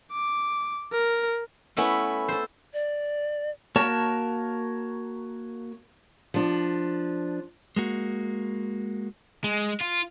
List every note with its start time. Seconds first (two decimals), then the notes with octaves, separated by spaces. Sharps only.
0.12 D6
0.92 A#4
1.77 A3 B3 C#4 E4
2.29 A4 C5
2.74 D5
3.76 A#3 F#4 A#4 C#5 A5
6.34 F3 D4
7.76 G#3 A#3 F#4
9.44 G#3
9.81 F4